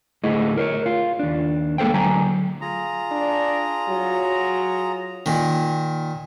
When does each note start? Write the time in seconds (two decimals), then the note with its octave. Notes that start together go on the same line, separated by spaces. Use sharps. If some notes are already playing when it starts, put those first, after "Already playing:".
0.24 D2 A2 A3 E4 G#4 D#5
0.57 A#4 C5 C#5
0.86 F4
1.19 D#2 D4
1.78 G#3 A#3 A4 C5 G5
1.94 D2 F#3 G#5 A#5
2.61 F4 G#4 A#5
3.12 D4
3.88 F#3
5.26 A#2 D#3